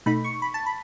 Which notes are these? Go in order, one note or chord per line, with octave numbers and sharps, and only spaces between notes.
B2 A3 D#4 B5
C#6
B5
A5
B5